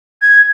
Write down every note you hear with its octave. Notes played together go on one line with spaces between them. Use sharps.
G#6